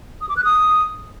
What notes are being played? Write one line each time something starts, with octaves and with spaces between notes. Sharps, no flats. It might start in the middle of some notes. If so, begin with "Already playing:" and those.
D#6
D6
F#6
D#6